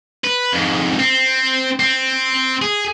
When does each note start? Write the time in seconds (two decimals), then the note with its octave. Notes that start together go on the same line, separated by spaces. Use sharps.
0.24 B4
0.53 F2 G#2
1.00 C4
1.79 C4
2.62 G#4